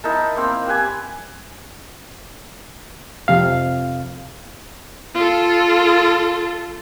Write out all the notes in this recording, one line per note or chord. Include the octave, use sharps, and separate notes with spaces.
D#4 E4 A#4 A5
A#3 C4 F5 E6
G4 B4 G#5
F2 C3 F5
F4 A4